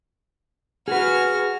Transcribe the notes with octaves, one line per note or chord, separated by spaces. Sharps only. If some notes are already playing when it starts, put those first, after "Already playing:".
F#4 G#4 B4 F6